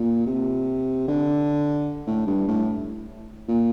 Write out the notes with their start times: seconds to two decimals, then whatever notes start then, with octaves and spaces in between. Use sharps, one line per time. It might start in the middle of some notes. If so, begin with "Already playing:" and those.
Already playing: A#2
0.26 C3
1.08 D3
2.07 A2
2.27 G2
2.48 A2
3.49 A#2